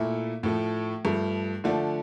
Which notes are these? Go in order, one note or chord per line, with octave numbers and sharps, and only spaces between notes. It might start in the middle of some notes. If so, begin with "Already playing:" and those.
Already playing: A#2 A3 E4
A2 F3 A3
G2 F3 A3
D3 F3 A3 D4